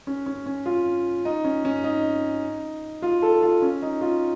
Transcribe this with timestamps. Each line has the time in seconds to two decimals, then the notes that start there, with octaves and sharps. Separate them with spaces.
0.07 C#4
0.26 C#4
0.46 C#4
0.66 F4
1.25 D#4
1.44 C#4
1.65 C#4
1.84 D#4
3.02 F4
3.22 A4
3.42 F4
3.62 C#4
3.82 D#4
4.01 F4